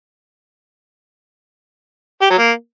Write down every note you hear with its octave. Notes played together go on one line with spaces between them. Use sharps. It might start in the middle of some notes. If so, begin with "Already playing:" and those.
G4
F#3
A#3